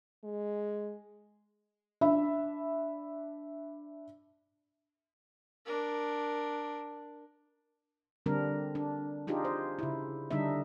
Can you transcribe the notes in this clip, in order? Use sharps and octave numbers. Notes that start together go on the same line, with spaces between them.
G#3
D4 E5 B5
D4 A#4
D3 G3 C4 D4 A#4
D4
D4 D#4 F4 G4 G#4
C5
C#3 E4
D3 G3 D4 D#4 E5